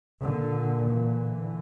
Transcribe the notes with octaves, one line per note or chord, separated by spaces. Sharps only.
A#2 D3
D3 E3